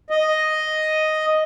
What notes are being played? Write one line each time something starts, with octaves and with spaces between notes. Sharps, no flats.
D#5